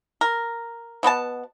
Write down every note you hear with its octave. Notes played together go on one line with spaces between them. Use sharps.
A#4
B2 B3 C4 A5